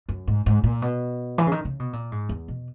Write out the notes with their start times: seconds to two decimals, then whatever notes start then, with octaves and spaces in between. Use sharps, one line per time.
0.09 F#2
0.27 G#2
0.46 G#2
0.64 A#2
0.82 B2
1.38 E3
1.47 C#3
1.52 D#3
1.65 C#3
1.80 B2
1.93 A#2
2.12 G#2
2.29 E2
2.48 B2